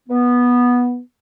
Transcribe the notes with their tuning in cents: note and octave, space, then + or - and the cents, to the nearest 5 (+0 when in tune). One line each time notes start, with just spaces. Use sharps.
B3 -10